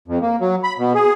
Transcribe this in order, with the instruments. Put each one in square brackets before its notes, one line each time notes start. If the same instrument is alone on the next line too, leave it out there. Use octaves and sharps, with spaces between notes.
[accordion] F2
A#3
F#3
B5
B2
G#4